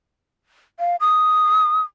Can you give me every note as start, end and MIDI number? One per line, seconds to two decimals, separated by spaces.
0.79 0.96 77
1.00 1.81 87